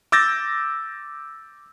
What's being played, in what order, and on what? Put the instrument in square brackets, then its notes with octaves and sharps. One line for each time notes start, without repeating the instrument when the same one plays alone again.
[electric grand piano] D6 E6 G6 A6 A#6